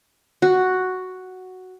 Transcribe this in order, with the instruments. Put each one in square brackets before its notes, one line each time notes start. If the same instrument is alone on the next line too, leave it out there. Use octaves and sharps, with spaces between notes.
[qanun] F#4